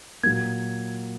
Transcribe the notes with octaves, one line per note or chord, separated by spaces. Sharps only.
A#2 F#3 A#3 G#6